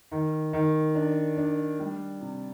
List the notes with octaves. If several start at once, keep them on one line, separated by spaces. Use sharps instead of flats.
D#3
D#3
D4
D4
G3
C3